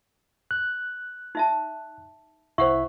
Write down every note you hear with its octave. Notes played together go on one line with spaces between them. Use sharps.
F#6
D#4 E5 A5
C2 E4 C5 E5 F#5 C#6